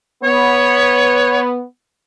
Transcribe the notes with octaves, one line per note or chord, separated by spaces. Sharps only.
B3 C#5